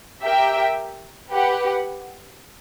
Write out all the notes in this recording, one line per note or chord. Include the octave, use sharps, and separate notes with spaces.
G4 A#4 E5 G5
G4 B4 F#5